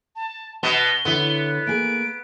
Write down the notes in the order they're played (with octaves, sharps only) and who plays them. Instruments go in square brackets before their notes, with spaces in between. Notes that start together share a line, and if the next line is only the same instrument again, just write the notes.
[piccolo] A5
[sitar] B2 B3 [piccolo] G7
[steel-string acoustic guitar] D3 E4 C#5 [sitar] B3
[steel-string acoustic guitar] A#3 G#4 [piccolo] D7